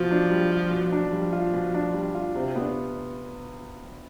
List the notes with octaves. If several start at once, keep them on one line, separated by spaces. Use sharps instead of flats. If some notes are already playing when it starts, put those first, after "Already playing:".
Already playing: B2 F3
D4
G3
F4
B2
D4
F3 G3
F4
B2
D4
G3
F4
C3 C4
B3 D4